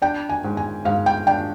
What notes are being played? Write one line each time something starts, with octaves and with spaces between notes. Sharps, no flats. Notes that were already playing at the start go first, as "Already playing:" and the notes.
D4 G5
G#5
G#2
G#5
G#2 F5
G5
D4 G5